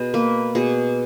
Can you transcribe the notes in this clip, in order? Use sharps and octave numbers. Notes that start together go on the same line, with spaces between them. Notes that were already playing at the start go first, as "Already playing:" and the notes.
Already playing: B2 G#4
A#3 B4
B2 G#4